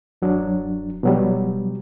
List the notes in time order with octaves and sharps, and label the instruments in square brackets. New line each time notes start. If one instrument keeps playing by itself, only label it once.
[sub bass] D1 [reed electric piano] F#2 F#3 D4
[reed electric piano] B2 F#3 G3